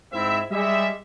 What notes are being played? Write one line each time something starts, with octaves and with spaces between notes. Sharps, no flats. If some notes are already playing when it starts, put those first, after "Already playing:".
G#2 C4 E4 C5 E5
G3 G#3 E5